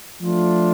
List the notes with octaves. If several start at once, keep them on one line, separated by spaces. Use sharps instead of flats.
F3 A3 D4 F4